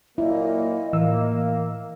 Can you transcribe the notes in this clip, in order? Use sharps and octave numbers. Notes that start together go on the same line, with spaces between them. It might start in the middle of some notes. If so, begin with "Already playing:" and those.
A#2 F#3 A#3 E4 D#5
A2 E3 A#3 E6